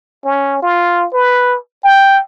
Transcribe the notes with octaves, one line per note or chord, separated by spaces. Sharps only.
C#4
F4
B4
G5